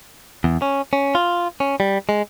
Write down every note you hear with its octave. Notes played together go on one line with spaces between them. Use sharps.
E2
C#4
C#4
F4
C#4
G3
G#3